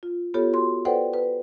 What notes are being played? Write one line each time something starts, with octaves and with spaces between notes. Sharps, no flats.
F4
B3 F4 G4 A4 C#5
F#4 C6
A4 B4 C5 D5 F#5 G5
B4